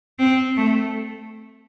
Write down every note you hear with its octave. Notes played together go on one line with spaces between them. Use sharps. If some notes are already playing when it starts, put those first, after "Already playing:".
C4
A3